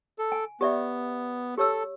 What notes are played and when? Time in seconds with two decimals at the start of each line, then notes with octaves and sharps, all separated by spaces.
0.19 A4
0.32 G#5
0.61 B3 G4 D5 E5
1.58 G4 A4 C#5 E6